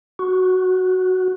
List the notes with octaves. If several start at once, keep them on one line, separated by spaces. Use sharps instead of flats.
F#4